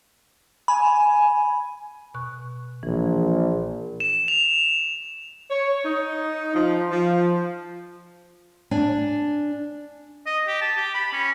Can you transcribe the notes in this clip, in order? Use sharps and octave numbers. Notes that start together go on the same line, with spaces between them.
G#5 B5
B2 C#6 F#6
A#1 E3
E7
F7
C#5
D#4
F3
F3
D4 G#5
D#5
G4
A5
G4
B5
C#4